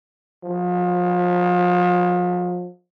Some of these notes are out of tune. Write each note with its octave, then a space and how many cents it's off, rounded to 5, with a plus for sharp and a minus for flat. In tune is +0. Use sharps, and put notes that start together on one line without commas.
F3 +35